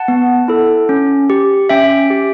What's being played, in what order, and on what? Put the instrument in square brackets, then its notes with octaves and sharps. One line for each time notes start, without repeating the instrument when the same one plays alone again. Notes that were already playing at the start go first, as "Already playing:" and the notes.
Already playing: [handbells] F#5 A5
B3
E4 A4
C#4
G4
C#4 E5 G5
G4